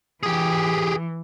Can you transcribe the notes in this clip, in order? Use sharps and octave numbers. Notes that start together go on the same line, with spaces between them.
E3 G4 G#4